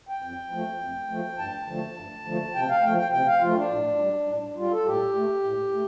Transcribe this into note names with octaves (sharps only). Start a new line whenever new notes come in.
G5
F2
F3 A3
F2
F3 A3
G2 A5
D3 F3 A3
G2
D3 F3 A3
C3 G5
F5
F3 A3 G5
G5
C3 G5
F5
F3 A3 F4
D4
A2
G3
A2
G3 F4
A4
A2 G4
A3
A2
A3